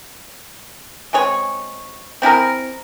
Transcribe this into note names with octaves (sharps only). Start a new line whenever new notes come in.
G#3 C4 G#4 C#5
C4 E4 G#4 A#4